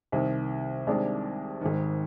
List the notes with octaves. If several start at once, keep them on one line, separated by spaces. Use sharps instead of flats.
C2 C3 D#3
C2 C3 D#3 G#3 D4
G#1 G#2 D#3